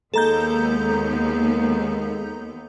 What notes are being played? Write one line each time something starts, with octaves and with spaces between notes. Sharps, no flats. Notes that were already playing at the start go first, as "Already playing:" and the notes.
D#2 D#3 G#3 A#3 B3 A4 A#5 G6